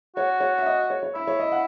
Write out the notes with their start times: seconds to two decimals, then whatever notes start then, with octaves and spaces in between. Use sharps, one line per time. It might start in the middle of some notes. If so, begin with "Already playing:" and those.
0.16 F#4 C#5
0.40 C#5
0.58 E5
0.66 D#5
0.90 C#5
1.03 C#5
1.15 E4 E5
1.27 C#5
1.39 D#5
1.52 F#5